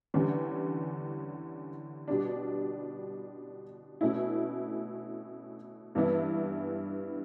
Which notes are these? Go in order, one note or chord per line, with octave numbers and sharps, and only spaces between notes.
E2 D3 G3 C#4
B2 G3 D4
B2 A3 C#4 E4
G2 E3 B3 E4